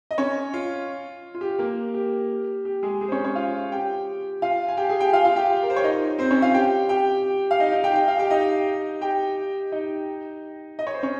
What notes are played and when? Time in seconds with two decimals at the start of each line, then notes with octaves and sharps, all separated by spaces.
0.11 D#5
0.18 C#4 C#5
0.54 F4
1.35 F4
1.41 G4
1.59 A#3 A#4
1.94 G4
2.65 G4
2.83 G#3 G#4
3.01 G#3 G#4
3.08 C5
3.12 C#4 C#5
3.24 C#4 C#5
3.35 F4 F5
3.72 G4 G5
4.42 F4 F5
4.68 G#5
4.77 G4 G5
4.89 G#4 G#5
5.00 G4 G5
5.13 F4 F5
5.24 F4 F5
5.36 G4 G5
5.63 A#4
5.70 C5
5.76 C#5
5.84 D#4 D#5
6.19 C4 C5
6.31 C#4 C#5
6.42 F4 F5
6.54 G4 G5
6.89 G4 G5
7.51 F5
7.60 D#4 D#5
7.72 D#4 D#5
7.84 G4 G5
7.95 G5
8.08 F5
8.18 G4 G5
8.30 D#4 D#5
9.01 G4 G5
9.72 D#4 D#5
10.79 D#5
10.87 C#5
10.94 C5
11.03 C#4 C#5